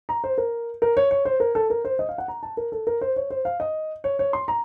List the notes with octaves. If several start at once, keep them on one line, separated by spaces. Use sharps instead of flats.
A#5
C5
A#4
A#4
C#5
C#5
C5
A#4
A4
A#4
C5
D#5
F5
F#5
A#5
A5
A#4
A4
A#4
C5
C#5
C5
F5
D#5
C#5
C#5
C6
A#5